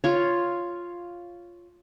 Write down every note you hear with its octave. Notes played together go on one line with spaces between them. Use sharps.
F4 C#5